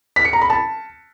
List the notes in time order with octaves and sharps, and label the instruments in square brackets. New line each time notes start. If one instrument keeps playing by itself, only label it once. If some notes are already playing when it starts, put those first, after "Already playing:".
[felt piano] B6
C#7
A#5
B5
A5